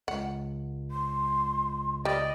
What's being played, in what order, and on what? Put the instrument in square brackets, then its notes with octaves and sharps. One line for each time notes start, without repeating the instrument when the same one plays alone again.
[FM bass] C#2 [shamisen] F#5
[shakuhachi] C6
[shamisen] G3 [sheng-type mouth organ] D5 D#5